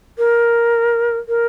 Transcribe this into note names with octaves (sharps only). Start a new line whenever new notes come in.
A#4
A#4